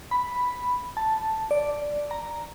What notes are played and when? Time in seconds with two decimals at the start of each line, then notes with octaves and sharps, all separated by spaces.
0.11 B5
0.97 A5
1.51 D5
2.11 A#5